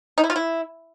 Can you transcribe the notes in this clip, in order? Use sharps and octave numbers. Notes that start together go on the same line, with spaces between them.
D#4
E4
F4
E4